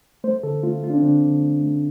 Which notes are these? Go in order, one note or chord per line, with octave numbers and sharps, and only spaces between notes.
A3 C5
D3 A4
A3 F4
A3 F4
D4
C4
D3 D4
D3
A3
A3